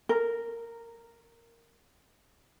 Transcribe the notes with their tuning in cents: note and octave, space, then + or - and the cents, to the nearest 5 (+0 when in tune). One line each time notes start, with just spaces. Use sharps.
A#4 -10